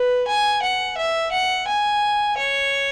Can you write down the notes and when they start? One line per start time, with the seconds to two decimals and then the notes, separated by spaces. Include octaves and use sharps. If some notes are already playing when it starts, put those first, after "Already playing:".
Already playing: B4
0.28 G#5
0.62 F#5
0.97 E5
1.32 F#5
1.67 G#5
2.37 C#5